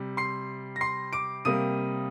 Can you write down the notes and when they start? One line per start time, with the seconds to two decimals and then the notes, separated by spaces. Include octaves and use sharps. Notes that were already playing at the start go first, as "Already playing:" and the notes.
Already playing: C3 G3
0.17 C6 C7
0.76 A#6
0.81 C6 C7
1.13 D6 D7
1.45 C3 G3 A#3 D#6 D#7